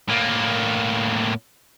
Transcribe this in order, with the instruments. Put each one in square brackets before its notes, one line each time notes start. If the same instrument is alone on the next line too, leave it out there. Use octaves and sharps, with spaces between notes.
[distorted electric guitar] A2 A#3